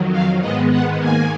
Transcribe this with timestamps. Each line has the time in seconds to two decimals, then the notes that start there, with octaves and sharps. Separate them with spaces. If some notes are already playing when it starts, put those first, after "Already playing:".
Already playing: F2 D#3 F#3
0.12 F5
0.41 G#2 D#3 G#3 B3 D#5
0.71 F#5
1.00 G#2 D#3 A#3 G#5